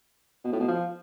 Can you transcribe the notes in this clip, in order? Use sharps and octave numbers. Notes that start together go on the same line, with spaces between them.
B2
A2
B2
F3